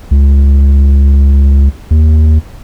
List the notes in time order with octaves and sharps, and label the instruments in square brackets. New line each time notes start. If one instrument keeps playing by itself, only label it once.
[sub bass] C#2
D#2